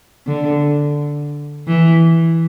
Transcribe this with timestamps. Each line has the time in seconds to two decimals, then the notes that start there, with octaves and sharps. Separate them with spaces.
0.27 D3
1.68 E3